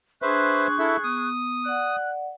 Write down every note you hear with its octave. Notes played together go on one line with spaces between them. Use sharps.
D4 G#4 B4 C5 E5 C6 C#6 F#6
E4 A4 E5
B3 D#6
D5 F#5 F#6